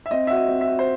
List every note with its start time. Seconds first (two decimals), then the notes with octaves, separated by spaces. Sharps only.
0.06 E5
0.11 C4 D#5
0.27 F#4 E5
0.36 D#5
0.48 C4
0.61 E5
0.68 F#4
0.79 C5